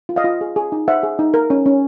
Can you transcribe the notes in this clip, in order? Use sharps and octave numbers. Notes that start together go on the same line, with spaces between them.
F4
D#5 F5
F4
G#4
G#4
D#4
C5 E5 F#5
G#4
D#4
A#4
C#4
C#4